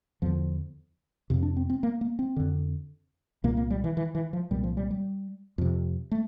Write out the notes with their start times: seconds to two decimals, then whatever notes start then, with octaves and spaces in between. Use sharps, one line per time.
0.22 E2 D3 F3
1.30 F2 C3
1.43 D4
1.57 C4
1.70 C4
1.83 A#3
2.01 A#3
2.19 C4
2.36 F2 D3
3.44 C2 A#2 A#3
3.57 A#3
3.70 G3
3.84 E3
3.97 E3
4.15 E3
4.33 F3
4.51 C2 A#2 G3
4.64 F3
4.77 G3
4.91 G3
5.58 F2 C3
6.11 A3